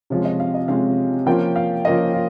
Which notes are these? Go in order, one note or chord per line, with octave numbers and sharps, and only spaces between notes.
C3 F3 G#3 C#4 F4 C#5
D#5
F5
D#5
C3 F3 G#3 C#4 F4 F5
F3 A#3 C#4 F4 G5
F5
F3 A#3 C#4 F4 D#5
F4